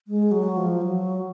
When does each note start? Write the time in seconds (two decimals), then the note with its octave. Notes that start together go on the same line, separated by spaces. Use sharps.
0.08 G#3
0.31 F#3
0.57 F3
0.81 F#3